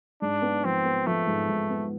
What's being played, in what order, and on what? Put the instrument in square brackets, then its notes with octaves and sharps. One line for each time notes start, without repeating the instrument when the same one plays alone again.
[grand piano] G#2 [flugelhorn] D4
[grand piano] B3
[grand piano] F3 [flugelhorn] C4
[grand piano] B3
[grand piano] F3 [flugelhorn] A3
[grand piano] G#2
G#2
B3